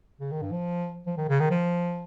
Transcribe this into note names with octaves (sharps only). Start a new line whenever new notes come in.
C#3
D#3
G2
F3
F3
D#3
C#3
D#3
F3